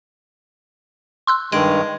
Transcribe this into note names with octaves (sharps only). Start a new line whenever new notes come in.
C6 E6 F#6
G2 D#3 G#3 D7